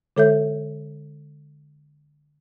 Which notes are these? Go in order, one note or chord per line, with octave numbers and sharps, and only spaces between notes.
D3 G#3 A4 C#5 E5 G6